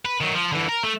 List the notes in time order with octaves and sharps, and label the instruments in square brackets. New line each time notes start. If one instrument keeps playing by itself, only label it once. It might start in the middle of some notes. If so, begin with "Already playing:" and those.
[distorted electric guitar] B4
D#3 F#3
F3
D3 E3
A#4
A3